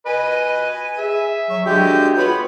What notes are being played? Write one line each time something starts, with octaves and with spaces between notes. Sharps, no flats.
B4 D#5 G#5
G#4 E5
F#3 C#6
D3 G#3 F#4 G4 G6
B3 F4 C#5 B5